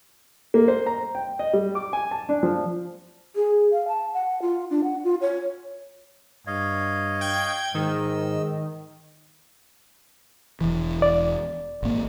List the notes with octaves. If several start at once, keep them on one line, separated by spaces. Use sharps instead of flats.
A#3
C5
A#5
G5
D#5
G3
D6
G#5
A5
D4
F3
G#4
F5
A5
F#5
F4
D4
F#5
F4
C#5
G2 C#5 D#5 F5
G5 G#6
G#2 D#3 D#5 E6
E1 E3
D5
G#1 A#3